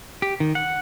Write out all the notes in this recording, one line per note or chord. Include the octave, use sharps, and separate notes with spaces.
G4
D#3
F#5